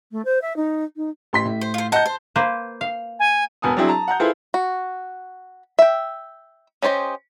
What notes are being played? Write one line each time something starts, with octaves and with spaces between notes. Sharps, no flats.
A3
C5
E5
D#4
D#4
A1 C6 B6
A2
C5
F4 C5
D#4 F#5 A5 G6
C5
A#3 B4 C5
F5
G#5
E1 B3 B4 G#5 A5 D#6
F#3 C4 D4 E4 G#4
A5 A#5
F#5 A#5 G6
E4 F4 G#4 A4 B4 C5
F#4
E5 G5
C#4 G4 C5 C#5 D#5